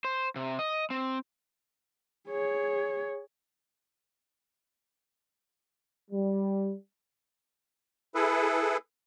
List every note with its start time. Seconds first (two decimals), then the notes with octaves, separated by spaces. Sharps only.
0.05 C5
0.36 C3
0.59 D#5
0.90 C4
2.29 G#4 C#5
6.10 G3
8.15 E4 G#4 A4 B4